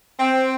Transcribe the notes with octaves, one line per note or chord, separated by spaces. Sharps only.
C4